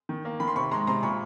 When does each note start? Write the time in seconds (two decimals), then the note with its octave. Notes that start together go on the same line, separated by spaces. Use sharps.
0.09 D#3
0.25 A#3
0.40 D#3 B5
0.48 C6
0.56 C3 B5 C#6
0.71 G#3 A#5 C6
0.87 C3 A#5 C6
1.03 A#2 B5 C#6